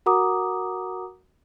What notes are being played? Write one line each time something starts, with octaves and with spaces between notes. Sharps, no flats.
F#4 A#4 F#5 A#5 D6 D#6